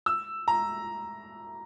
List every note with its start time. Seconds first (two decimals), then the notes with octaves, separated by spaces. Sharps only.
0.06 E6
0.48 A#5